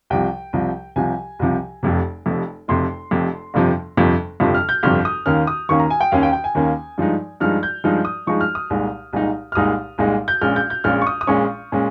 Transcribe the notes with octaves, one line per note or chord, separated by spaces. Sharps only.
C2 C3 F3 G5
C2 C3 F3
C2 C3 F3 G#5
C2 C3 F3
F1 F2 C3
F1 F2 C3
F1 F2 C3 C6
F1 F2 C3
G1 F2 C3 F3
G1 F2 C3 F3
G1 F2 C3 F3
F6
G6
G1 F2 C3 F3 F6
D#6
D#2 D#3 A#3 C#4 F6
D#6
D#2 D#3 A#3 C#4 C#6
A#5
G#5
G5
D#2 D#3 A#3 C#4 F5
G5
G5
G#5
D#2 D#3 A#3 C#4
G2 F3 G#3 D#4
G2 F3 G#3 D#4 F6
G6
G2 F3 G#3 D#4 F6
D#6
G2 F3 G#3 D#4 C#6
F6
D#6
C2 A#2 G#3 D#4
C2 A#2 G#3 D#4
F6
C2 A#2 G#3 D#4 D#6
C2 A#2 G#3 D#4
G6
A#1 A#2 G#3 C#4 F6
G6
G6
A#1 A#2 G#3 C#4 F6
C#6
D#6
D#6
A#1 A#2 G#3 C#4 C#6
A#2 G#3 C#4